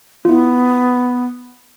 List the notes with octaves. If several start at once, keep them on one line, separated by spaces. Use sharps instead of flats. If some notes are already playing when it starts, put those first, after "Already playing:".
B3 E4 F4